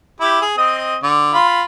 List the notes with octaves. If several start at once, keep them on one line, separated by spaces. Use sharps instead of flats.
E4 G4
G#4
C4 D#5 D#6
D3
F4 B5